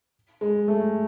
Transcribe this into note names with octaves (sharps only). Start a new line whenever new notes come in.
G#3
A3